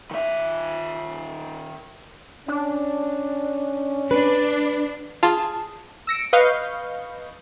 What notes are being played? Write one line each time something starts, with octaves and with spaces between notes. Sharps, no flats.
D#3 E5
C#4 D4
D4 B4
F4 G#4 A5
E6 A#6 C#7 D7
B4 D#5 F5 C#6 G6